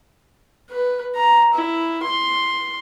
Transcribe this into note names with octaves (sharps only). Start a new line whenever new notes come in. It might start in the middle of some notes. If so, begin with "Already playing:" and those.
B4
A#5
E4
C6